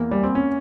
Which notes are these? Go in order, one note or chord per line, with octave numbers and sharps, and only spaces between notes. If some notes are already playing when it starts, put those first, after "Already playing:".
Already playing: E2 E3 A#3
G3
C4
C#4